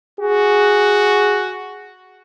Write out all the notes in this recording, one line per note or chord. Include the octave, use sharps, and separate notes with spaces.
F#4 G#4